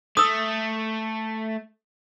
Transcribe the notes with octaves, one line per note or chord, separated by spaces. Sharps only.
A3 D#6 E6